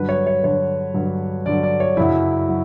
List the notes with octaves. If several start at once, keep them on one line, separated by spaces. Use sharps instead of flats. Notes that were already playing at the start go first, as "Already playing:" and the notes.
Already playing: G2 D3 F#3 B4
C#5
C#5
G2 D3 F#3 C#5
G2 D3 F#3
G2 D3 F#3 D5
D5
C#5
F#2 C#3 F#3 E4
F#3